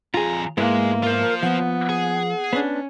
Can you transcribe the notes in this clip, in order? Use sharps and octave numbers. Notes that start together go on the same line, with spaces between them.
F2 F4 G#4 A#5
G#2 G#3 A#3 B3 E4
F4 A#4 C5
F3 B3 F#5
G#4
B3 C#4 D4